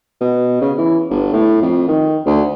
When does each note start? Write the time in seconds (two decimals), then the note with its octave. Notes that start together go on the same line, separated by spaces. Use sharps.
0.21 B2
0.61 C#3
0.78 E3
1.10 G1
1.33 A2
1.62 F2
1.88 D#3
2.26 D2